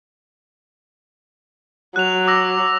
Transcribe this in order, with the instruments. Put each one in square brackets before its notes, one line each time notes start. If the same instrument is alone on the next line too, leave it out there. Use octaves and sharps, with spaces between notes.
[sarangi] F#3 [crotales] F#6 F7
[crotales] D6 E6 A#6